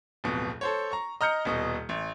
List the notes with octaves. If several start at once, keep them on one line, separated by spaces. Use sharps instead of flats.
D1 F2 B2
A4 C5 C#5
A#5 C#6
D#5 A#5 F6 G6 C#7
D#1 B2 D#5
A1